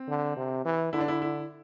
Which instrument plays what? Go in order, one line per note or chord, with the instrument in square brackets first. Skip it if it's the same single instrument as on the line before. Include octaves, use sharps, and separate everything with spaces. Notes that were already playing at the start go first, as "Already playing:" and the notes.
Already playing: [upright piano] C4
[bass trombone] D3
C3
E3
[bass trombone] D3 [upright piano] E4
[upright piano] D4
E4
E4